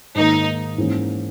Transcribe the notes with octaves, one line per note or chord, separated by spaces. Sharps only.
G#2 D#3 A#3 D#4
G#2 E3 A#3 C#4